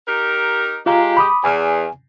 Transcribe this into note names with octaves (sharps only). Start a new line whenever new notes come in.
D#4 G4 A#4
G#3 F4 G4 F5 A#5
B5 D6 D#6
E2 G#5